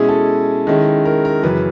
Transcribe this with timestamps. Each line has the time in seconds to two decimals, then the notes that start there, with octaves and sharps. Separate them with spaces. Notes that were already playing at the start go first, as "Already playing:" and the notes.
Already playing: B2 G#3 C#4 E4 G#4
0.09 A4
0.67 D#3 G#3 C#4 E4
1.05 A#4
1.25 A#4
1.43 F#2 C#3 E3 B4